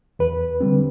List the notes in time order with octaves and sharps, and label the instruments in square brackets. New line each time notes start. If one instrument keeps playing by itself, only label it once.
[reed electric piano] E2 B4
D3 G3 C4